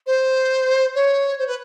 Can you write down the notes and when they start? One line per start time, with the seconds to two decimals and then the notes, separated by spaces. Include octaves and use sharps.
0.06 C5
0.95 C#5
1.38 C5
1.47 B4